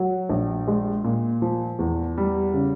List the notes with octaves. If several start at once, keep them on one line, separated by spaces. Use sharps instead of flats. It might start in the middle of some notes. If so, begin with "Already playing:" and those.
Already playing: F#3
A#1
G#3
A#2
F3
E2
G3
C#3